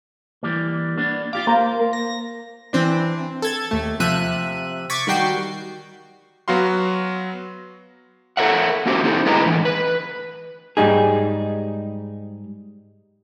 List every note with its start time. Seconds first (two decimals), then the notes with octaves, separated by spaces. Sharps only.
0.43 E3 G3 A#3
0.98 A#3 B3 D4
1.33 F4 G4 F5 D6
1.47 A#3 A#4 C5
1.93 A#6
2.73 E3 C4 D4
3.42 A4 G#6 A6
3.71 D#2 A3
4.00 C3 F3 E5 F#6 D#7
4.90 C#6 D6 G#6 A6 B6
5.07 D#3 G3 F#4 G5 C7
6.48 F#3 B3 F#4 F5 C6
8.37 A4 A#4 C#5 E5 F#5
8.86 A#3 C#4 F#4 G4 A#4 C5
9.03 D#3 C4 D#4 E4 A4
9.25 D3 G#3 E4 B4 D#5 A#5
9.44 A2 D3 E3
9.65 B4
10.77 G#2 G3 D#4 G#4